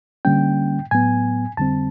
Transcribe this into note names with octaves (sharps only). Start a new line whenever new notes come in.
D3 G3 A#3 C#4 G5
A2 F#3 B3 G#5
F2 D3 G3 C4 A5